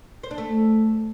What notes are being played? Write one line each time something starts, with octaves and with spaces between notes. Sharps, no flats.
C5
D4
A3